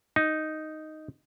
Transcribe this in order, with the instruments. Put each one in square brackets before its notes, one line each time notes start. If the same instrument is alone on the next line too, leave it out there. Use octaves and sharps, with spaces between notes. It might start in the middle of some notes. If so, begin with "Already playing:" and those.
[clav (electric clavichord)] D#4